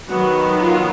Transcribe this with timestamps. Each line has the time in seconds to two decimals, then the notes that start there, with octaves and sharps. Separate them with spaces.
0.08 D#3 F#3 B3 F#4
0.62 F4